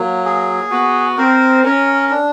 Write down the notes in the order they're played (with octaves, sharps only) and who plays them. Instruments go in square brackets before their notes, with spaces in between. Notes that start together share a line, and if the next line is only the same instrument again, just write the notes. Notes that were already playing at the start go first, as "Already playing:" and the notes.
Already playing: [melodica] F#3 [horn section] A#3
[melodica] G#4
[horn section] B3 [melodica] F#4
[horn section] C4 [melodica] A#4
[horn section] C#4 [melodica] A#4
[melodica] D4